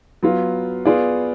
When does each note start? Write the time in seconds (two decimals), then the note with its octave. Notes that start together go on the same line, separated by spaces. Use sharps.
0.23 F#3 B3 F4
0.86 B3 F4 G#4 D5